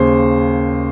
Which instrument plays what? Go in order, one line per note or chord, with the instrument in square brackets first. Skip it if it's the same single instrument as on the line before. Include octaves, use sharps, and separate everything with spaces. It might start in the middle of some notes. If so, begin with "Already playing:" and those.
Already playing: [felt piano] D#2 C#3 C5